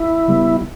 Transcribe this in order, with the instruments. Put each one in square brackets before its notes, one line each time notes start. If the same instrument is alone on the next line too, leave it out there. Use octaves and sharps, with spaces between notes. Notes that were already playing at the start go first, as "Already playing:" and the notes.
Already playing: [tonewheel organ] E4
[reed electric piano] C#3 G3 B3